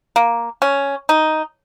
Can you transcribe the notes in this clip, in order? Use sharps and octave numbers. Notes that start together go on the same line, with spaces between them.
A#3
C#4
D#4